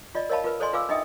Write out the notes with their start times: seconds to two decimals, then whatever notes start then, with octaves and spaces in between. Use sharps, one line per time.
0.15 F4 D5 D#5
0.29 A#4 C#5 D#5 F5 A5 B5
0.44 F4 A#4 B4
0.60 A4 C5 D5 D#5 G#5 C6
0.73 F4 B4 F5 G#5 D6 E6
0.89 D4 D#4 D#5 E5 G5 D#6